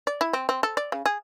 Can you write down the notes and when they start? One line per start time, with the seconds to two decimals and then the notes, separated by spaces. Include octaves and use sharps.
0.07 D5
0.21 E4
0.33 C4
0.49 C4
0.63 A4
0.77 D5
0.92 C#3
1.06 G#4